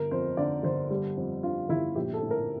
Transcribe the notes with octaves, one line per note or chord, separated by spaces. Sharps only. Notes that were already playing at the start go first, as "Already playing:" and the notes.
Already playing: G1 A#4
F2 C5
D3 D5
G1 C5
G3
F2
D3 F4
G1 E4
A#1 G4
A4
A2
A#4